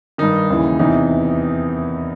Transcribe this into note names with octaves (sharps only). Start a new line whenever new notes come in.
G2 D#3 D#4
D#2 C#3 E3
E2 C3 E3 D#4